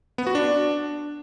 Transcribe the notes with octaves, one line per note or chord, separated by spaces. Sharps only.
B3
F#4
D4